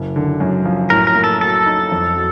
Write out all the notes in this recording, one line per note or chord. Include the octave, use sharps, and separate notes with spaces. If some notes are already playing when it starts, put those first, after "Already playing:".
Already playing: F#1
D3
F#2
F3
A2 A#4
A#4
A#3
A4
F#3 A4
D#4
F2
F#3